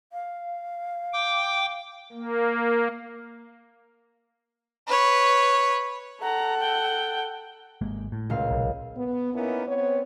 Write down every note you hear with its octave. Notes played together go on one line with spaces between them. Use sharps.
F5
G5 D6
A#3
B4 C#5
A4 F#5 A#5
G5
G#1 G#3 A#3
A2
C#2 A#2 F5
B1
B3
A#3 B3 C#4 D#4 E4 A#4
B3 C4 C#5